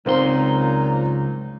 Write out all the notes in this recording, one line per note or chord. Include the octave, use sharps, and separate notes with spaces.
C#2 A#2 F#3 C4 D#4 C5 F5 C6